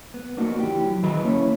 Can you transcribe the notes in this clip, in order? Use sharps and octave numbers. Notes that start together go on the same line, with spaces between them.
B3
A#3 D4 D#4 F#4
E3 G4
F#3
D#3 E3 G#4 B4 D#5 B5
A#3 C#4 E4 C#5